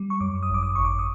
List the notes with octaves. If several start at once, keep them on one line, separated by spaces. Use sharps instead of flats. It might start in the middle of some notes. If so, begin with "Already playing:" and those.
Already playing: G3
C#6
F#2 D6
D#6
G#1 D6
D#6
G#1 C#6
D6
D#6